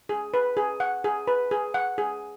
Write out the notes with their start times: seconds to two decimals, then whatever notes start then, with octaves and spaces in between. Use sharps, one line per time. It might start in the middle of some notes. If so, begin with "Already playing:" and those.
0.09 G#4
0.34 B4
0.57 G#4
0.80 F#5
1.04 G#4
1.27 B4
1.51 G#4
1.74 F#5
1.98 G#4